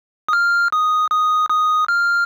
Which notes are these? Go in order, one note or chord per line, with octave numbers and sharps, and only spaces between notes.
D#6
F6
D#6
D#6
D#6
F6